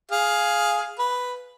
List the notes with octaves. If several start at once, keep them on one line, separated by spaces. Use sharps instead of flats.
G#4 F5
B4